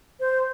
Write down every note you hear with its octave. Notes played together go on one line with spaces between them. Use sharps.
C5